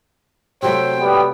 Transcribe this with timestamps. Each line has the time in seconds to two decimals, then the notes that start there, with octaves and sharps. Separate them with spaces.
0.62 C3 F#3 A3 C5 G5
1.01 G3 B3